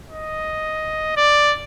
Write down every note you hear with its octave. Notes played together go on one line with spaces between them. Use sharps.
D#5
D5